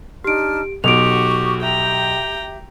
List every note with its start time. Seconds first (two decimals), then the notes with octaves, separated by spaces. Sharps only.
0.24 D4 D#4 G4 F6 D7
0.84 B1 F#4 G4 C#6 D6 D7 F7
1.62 G4 E5 G5 A#5